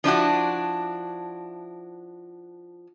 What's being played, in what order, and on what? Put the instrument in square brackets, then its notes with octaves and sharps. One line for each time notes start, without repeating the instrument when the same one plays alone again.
[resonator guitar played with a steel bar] F3 D4 E4 F#4